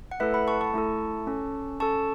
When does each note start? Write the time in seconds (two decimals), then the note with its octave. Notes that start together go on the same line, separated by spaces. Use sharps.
0.11 F#5
0.20 A3 E4 A4 B4 E5
0.34 F#5 B5
0.47 A5 C#6
0.61 A5 C#6
0.74 A3 E4 A4
1.27 C#4 A4
1.80 C#4 A4 A5 C#6